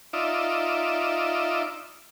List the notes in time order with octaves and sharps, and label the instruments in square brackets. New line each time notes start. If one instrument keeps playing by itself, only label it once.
[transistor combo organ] D#4 F4 D5 E5